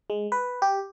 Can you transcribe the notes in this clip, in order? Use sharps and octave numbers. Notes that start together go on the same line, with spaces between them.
G#3
B4
G4